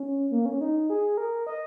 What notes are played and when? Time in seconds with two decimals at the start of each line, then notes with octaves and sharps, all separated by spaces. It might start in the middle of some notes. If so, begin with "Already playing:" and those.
Already playing: C#4
0.31 A#3
0.46 C#4
0.61 D#4
0.90 G#4
1.18 A#4
1.47 D#5